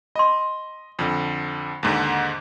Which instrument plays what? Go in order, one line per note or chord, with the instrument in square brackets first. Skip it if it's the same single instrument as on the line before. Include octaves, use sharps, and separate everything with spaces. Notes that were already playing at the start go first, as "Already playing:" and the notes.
[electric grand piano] D#5 [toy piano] B5 C6
[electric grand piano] F2 D3
D#2 G#2 D3